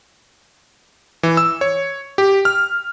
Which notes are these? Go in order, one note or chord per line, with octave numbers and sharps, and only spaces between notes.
E3
E6
C#5
G4
F6